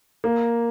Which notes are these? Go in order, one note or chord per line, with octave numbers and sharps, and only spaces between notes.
A#3